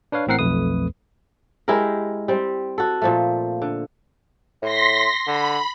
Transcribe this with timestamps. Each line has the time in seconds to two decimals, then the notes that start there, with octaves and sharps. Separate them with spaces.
0.12 D4 B4 C#5 F5
0.27 A1 A2 C4 A#4 F#5 C7
0.39 B1 F2 A3 B4 D#6
1.68 G#3 E4 G4 A#4
2.28 G3 C4
2.78 F#4 A4
3.02 A#2 F3 A3
3.62 D3
4.62 A2 C6 A#6 B6
5.27 D3 B5